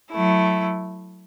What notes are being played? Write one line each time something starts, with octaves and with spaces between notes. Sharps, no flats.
F#3 A3 E4